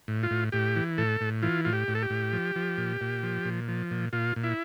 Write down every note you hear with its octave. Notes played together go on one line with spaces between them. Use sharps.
A2
F4
A2
A2 G4
E3
A2 A4
A2
E3 F4
A2 F4
G4
A2
A4
G4
A2
F3
F3
A#2
A#2
F3
A#2
F3
A#2
A#2 F4
A#2
E4